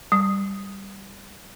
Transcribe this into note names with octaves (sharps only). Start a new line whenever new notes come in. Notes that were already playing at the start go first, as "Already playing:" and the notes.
G3